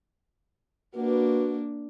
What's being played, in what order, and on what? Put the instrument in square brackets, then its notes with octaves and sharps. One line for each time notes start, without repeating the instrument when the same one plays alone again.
[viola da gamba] A#3 D4 [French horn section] F#4 B4